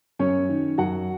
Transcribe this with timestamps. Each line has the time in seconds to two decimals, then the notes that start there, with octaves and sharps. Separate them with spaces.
0.19 F#2 C#4 C#5
0.49 D#3
0.78 F#2 F#4 F#5